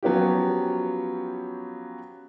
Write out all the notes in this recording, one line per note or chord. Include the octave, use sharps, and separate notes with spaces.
F3 F#3 B3 C#4 F4 G4